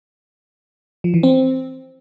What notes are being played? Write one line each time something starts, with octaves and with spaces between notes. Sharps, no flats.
F3
E3
C4